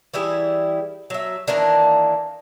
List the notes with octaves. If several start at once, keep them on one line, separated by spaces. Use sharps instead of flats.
E3 G3 E4 G#4
F#3 E5
D#3 E3 A#3 D4